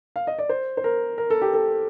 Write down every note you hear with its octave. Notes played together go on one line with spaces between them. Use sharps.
F5
D#5
D5
C5
C5
A#4
A#4
A4
G4
A4